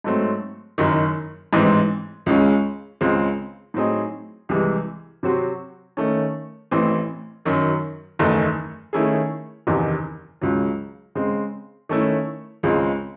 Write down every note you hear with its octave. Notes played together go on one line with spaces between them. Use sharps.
G#2 F#3 A3 C4
F#1 F#2 D#3
A1 G#2 E3 C4
C#2 C#3 G#3 C#4
C#2 C#3 G#3 C4
A2 F#3 C4 D#4 G#4
C2 C3 E3 G#3
C3 F#3 C4 F#4 C5
D#3 A3 C#4
A1 A2 E3 C4
F#2 D#3 F#3
F#1 E2 D#3 A3
D#3 A3 C#4 E4 G#4
F#1 E2 C3 D#3
C#2 C#3 F#3
C#3 G#3 C4
D#3 A3 C#4 E4
C#2 C#3 G#3 C4